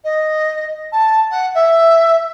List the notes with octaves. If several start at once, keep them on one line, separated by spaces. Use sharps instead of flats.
D#5
A5
F#5
E5